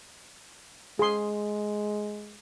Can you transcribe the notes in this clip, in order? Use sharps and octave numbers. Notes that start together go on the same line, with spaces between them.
G#3 G#4 C6